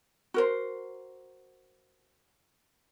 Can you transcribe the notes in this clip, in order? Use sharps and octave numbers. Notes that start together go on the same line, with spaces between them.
F#4 A#4 C5